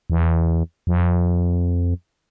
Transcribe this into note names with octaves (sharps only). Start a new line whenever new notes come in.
E2
F2